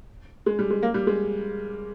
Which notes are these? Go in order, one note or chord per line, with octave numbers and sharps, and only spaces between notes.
G#3
G3
G#3
A#3
G3
G#3